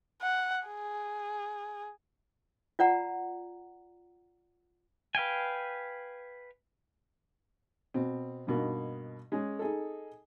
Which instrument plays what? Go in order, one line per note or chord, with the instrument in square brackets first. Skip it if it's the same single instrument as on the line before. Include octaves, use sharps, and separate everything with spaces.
[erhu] F#5
G#4
[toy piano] F4 D5 F#5 A#5
[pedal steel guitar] B4 F5 G5 G#5
[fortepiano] B2 C4
G2 B2 A#3 D#4
G#3 C#4 G#4
D#4 G#4 A4